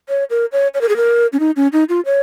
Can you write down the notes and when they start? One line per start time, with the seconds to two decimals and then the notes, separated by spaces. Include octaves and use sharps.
0.09 C#5
0.30 A#4
0.52 C#5
0.74 C#5
0.81 A#4
0.89 G#4
0.97 A#4
1.33 C#4
1.40 D#4
1.56 C#4
1.73 D#4
1.89 F4
2.06 C#5